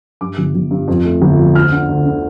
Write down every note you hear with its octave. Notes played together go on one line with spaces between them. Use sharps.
G2 D6
G1
G1
G2
F2
A3
G1
F3
D2 F6
D3
D2
D3